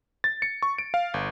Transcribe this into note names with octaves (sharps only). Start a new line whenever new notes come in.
A6
C#7
C#6
D7
F5
G1